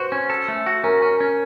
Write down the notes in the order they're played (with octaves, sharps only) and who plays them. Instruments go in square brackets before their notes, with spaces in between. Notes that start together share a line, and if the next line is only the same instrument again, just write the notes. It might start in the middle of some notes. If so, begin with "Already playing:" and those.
Already playing: [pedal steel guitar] F#4 [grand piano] B4 C5
[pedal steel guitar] C#4
A4
A3
F#4
[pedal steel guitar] C#4 [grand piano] A#4
[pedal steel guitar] C#4
C#4